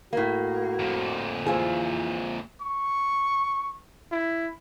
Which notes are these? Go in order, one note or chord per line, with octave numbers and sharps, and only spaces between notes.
A2 A#3 F#4
F2 A#2
E3 C4 F4 G#4
C#6
E4